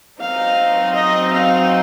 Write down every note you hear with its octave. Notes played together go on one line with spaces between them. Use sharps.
F#3 C4 D#4 F5
D#5
F5